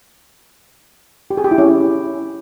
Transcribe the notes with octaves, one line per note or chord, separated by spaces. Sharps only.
G4
G#4
G4
E4
C#4